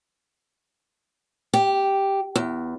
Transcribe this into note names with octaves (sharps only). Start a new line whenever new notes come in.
G4
E2